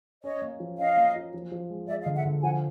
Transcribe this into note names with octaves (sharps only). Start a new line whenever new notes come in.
C#4 C#5 D#5
A#3
F3
C#4 D#5 F5
A#3
F4
F3
F3
G#3
G#3 D5 E5
D#5 F5
D3
E5 F#5
D3
F3 F#5 G#5